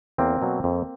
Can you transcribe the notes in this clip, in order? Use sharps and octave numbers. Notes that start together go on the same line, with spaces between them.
E2 A#3 C4
B2 F#3
F2